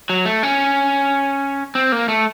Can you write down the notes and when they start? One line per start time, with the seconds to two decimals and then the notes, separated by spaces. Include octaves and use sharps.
0.10 F#3
0.26 A3
0.43 C#4
1.75 C4
1.92 A#3
2.08 A3